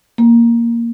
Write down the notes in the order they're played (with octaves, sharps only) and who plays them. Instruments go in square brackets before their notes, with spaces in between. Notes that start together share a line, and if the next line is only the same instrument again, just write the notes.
[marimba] A#3